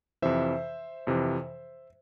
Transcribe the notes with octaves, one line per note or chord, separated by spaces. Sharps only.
F2 C3 E3 C5 E5
F2 C3 E3